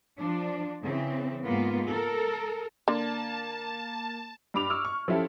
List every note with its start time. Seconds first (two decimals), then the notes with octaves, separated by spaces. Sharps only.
0.19 F3 D4
0.83 C#3 E3 C4
1.45 G#2 A#3 B3 F4
1.88 A4 A#4
2.88 D3 A#3 A5
4.54 G2 B5 D6 F7
4.70 C#6 D6 E6 F6
4.85 C#6
5.08 F3 C#4 E4 G4 A4